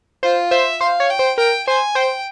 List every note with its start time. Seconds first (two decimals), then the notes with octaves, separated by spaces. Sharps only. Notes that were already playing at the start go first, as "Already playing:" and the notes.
0.23 F4 C5
0.51 C5 E5
0.81 C5 F5
1.00 C#5
1.10 G5
1.19 C5
1.38 A#4 G5
1.67 C5 G#5
1.95 C5 G5